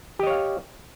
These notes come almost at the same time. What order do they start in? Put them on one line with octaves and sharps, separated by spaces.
G4 D#5 C#5 F5